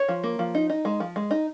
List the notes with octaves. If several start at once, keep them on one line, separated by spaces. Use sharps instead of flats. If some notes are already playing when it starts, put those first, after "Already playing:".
Already playing: C#5
F3
A#3
F3
D#4
D#4
G#3
F3
G#3
D#4